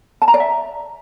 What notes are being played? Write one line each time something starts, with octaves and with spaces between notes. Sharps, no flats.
A5
A#5
D5
E5